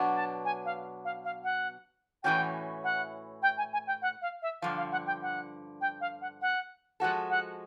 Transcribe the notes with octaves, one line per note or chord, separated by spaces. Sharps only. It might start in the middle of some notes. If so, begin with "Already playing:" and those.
Already playing: B2 F#3 B3 D4
A5
G#5
F5
F5
F5
F#5
A2 E3 A3 C#4 F#4 G5
F#5
G5
G#5
G#5
G5
F#5
F5
E5
G2 D3 F3 F5
F5
F#5
G5
F#5
G5
F5
F#5
F#5
F3 G#3 C#4 F#4 A4 F#5
F#5